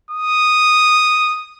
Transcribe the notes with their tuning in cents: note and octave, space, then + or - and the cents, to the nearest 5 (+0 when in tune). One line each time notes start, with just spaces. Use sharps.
D#6 -5